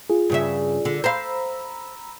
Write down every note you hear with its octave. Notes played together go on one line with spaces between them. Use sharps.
F4 G#4
G2 C#3 E5
D3
C5 F5 A#5 B5 E6